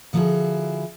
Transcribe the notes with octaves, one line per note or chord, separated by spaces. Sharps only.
D3 F3 D#4 E4 F#4 G#4